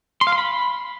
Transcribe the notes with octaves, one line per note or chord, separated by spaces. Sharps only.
C6
F5
C6
B5